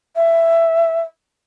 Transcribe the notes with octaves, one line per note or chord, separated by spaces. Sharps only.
E5